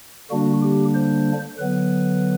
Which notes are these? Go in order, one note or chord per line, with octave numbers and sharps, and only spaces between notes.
D3 G3 A#3 D4 F#4
G4
C5
D3 F#3 B3 B4